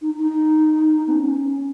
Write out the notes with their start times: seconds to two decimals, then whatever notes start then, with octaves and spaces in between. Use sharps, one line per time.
0.02 D#4
0.19 D#4
1.07 B3
1.11 C#4